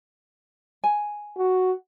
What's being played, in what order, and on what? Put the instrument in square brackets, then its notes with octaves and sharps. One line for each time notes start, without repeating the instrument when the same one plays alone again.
[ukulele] G#5
[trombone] F#4